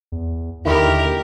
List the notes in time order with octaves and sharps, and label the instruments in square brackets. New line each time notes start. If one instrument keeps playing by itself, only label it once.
[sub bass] E2
[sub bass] D#2 [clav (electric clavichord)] D3 D#3 E4 [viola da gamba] G4 A#4